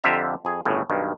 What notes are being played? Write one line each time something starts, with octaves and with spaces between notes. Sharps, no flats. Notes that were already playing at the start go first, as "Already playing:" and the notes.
F2 D3 F4 G4 E5 A#5
F2 G#4
G1 A2 C#3
B1 G2 D#3